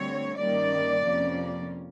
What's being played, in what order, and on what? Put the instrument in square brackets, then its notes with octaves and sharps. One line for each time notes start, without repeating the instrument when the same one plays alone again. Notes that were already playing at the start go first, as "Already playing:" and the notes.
Already playing: [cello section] D2 D3 G3 C4 C#5
G2 D#3 G3 A#3 C#4 D5
F2 C3 F3 A#3 C#4